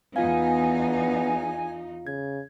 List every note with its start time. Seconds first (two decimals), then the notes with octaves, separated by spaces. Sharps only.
0.16 E2 B3 D#4 F4 F5 G#5
2.07 C#3 G#6